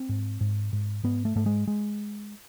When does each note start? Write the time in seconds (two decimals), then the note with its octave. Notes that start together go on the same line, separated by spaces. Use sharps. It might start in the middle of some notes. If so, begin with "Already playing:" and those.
Already playing: C4
0.09 G#2
0.41 G#2
0.73 G#2
1.04 G#2 B3
1.25 A3
1.35 G#2 A3
1.46 G#3
1.67 G#3